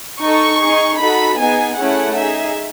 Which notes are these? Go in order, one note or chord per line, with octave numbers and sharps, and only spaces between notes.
D#4 A4 C#6
D#4 G#4
D#4 F#4 A4 B5
B3 D#4 G#4 G#5
A3 C#4 E4 G#4 F#5
D#4 G#4 E5